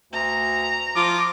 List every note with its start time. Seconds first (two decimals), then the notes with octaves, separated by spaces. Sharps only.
0.13 D2 A#5
0.96 F3 F4 D6